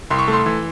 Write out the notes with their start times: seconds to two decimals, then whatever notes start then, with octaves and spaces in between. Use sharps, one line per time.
0.10 C2 C6
0.19 C#6
0.28 A3
0.33 C6
0.46 E3